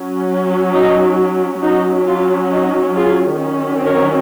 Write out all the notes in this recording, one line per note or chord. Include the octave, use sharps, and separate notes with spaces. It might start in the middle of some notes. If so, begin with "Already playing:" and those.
Already playing: F#3 C#4
D#4
F#3 C#4 D#4 F#4
F4
D#4 F#4
F4 G#4
D#3 F#3 C#4
A#4 C#5